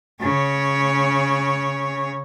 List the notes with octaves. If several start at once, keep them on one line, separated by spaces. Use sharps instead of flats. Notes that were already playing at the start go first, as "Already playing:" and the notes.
C#3 C#5